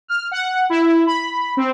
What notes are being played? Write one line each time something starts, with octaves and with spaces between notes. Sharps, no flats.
F6
F#5
E4
B5
C4